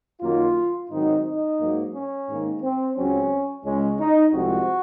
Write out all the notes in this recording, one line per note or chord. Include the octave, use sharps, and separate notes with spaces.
F#2 D#3 A#3 F4
G#2 D#3 F#3 C4 D#4
D#4
G#2 F#3 A#3
C#4
G#2 D#3 A#3
C4
C#2 C#3 F#3 C4 C#4
C#2 C#3 G#3 C#4
D#4
C2 C3 F3 G#3 C4 F#4